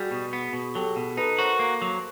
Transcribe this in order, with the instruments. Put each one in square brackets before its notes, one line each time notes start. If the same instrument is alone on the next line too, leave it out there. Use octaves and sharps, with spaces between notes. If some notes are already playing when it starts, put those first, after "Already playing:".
Already playing: [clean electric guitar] G3 [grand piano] F#4 G#4
[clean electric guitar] B2
B3
B2
[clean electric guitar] F#3 [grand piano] G4 A4
[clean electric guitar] B2
[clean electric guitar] D#4 [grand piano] A4 B4
[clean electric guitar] F#4 [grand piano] A#4 C5
[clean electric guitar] A#3
F#3